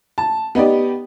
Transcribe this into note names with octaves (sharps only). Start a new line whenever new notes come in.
A5
B3 D#4 G4 D5